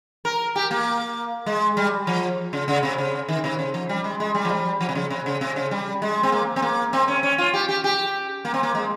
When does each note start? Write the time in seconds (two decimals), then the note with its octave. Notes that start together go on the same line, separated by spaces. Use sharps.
0.25 A#4
0.56 G4
0.71 A#3
1.46 G#3
1.77 G3
2.07 F3
2.53 C#3
2.68 C#3
2.83 C3
2.98 C#3
3.28 D#3
3.44 C3
3.59 C#3
3.74 F3
3.89 G3
4.04 G#3
4.20 G#3
4.35 G3
4.45 F3
4.50 G3
4.81 F3
4.89 C3
4.95 C#3
5.10 C3
5.26 C#3
5.41 C3
5.56 C#3
5.71 G3
6.02 G#3
6.23 C4
6.32 A#3
6.56 C4
6.62 A#3
6.93 C4
7.08 C#4
7.23 C#4
7.38 F4
7.54 G4
7.69 G4
7.84 G4
8.45 A#3
8.54 C4
8.63 A#3
8.75 G#3